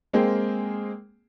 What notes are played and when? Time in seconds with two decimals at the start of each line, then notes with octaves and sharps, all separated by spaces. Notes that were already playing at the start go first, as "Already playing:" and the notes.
0.13 G#3 A#3 C4 G#4 A#4 G5